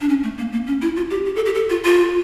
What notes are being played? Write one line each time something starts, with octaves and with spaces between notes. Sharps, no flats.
D4
C#4
A3
A#3
A#3
C#4
E4
F4
G4
G4
A4
G4
A4
F4
F4